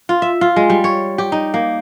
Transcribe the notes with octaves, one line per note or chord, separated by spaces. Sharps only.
F4
E5
F4
G#3
G3
C#5
G4
D#4
A#3